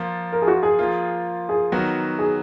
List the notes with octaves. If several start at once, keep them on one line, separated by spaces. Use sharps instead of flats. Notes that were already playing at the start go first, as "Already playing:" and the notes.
Already playing: F3 A#3 F4
A#4
G#4
F#4
G#4
F3 A#3 F4
G#4
D#3 F#3 B3 F#4
G#4